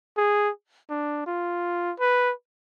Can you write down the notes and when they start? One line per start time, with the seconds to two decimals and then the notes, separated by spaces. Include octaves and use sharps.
0.17 G#4
0.90 D4
1.27 F4
1.99 B4